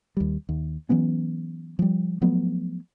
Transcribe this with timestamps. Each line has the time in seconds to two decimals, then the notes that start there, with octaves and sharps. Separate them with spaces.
0.17 D#2 G3
0.49 D#2
0.89 E3 F#3 B3 C#4
1.79 F3 G3
2.21 F3 F#3 A3 B3